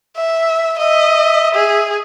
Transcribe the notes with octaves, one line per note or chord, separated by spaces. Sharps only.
E5
D#5 E5
G#4